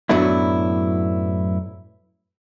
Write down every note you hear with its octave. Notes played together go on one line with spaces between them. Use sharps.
F#2 A2 F#3 B3 D4 E4